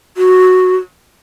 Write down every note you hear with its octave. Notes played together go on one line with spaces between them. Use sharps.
F#4